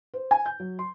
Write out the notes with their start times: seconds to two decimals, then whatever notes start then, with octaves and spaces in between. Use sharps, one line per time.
0.14 C5
0.31 G#5
0.46 G6
0.60 F#3
0.79 C6